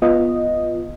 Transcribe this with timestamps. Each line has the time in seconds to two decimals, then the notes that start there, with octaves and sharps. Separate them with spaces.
0.02 B3 F4 D#5